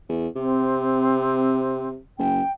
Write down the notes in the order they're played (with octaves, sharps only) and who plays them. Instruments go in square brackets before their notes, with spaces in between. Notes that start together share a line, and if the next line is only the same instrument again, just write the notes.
[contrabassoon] E2
[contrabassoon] C3 [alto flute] C4
[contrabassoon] F#1 [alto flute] G5